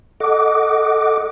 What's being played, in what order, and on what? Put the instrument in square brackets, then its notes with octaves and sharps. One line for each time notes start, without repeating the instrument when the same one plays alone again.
[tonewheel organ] A4 D#5 F#5 D6